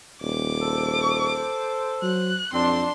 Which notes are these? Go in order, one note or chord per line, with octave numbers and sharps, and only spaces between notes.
D#1 D6
A4 C5
F#3 F#6
B1 F2 C4 D4 C6